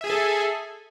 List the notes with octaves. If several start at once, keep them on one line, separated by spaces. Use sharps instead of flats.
G#4 A4 E5 G#5